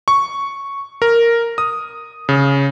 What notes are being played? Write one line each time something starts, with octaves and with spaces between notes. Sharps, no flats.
C#6
A#4
D#6
C#3